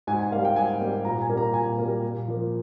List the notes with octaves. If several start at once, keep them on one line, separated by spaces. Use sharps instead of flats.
G#2 G#5
G#5
G3 A#3 F5
G5
G#2 G#5
G3 A#3
A#2 A#5
G#5
G3 A#3
A#5
A#2 G#5
G3 A#3
A#2
F3 A#3